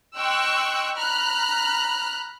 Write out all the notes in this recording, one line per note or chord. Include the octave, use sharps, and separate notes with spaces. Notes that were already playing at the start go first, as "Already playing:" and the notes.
D#5 G5 C6 C#6 E6 F#6
A#5 B5 F6 F#6